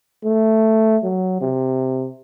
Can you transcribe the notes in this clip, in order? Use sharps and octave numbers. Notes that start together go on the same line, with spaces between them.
A3
F#3
C3